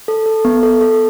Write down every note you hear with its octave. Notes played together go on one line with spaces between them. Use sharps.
A4
A4
B3
A4
A4